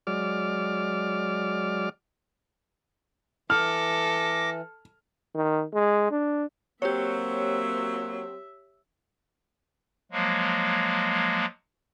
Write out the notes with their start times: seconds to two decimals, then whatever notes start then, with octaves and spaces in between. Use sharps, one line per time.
0.07 F#3 G#3 D5 D6 F6
3.50 E3 A4 D6 F6 A#6
5.35 D#3
5.74 G#3
6.11 D4
6.82 F#3 A#3 C4 G4 C#5 E5
10.12 F3 F#3 G#3 A#3